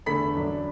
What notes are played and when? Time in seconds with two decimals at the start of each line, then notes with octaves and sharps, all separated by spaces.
0.06 E2 D3 A3 B5 B6
0.35 F#2 F#3 D4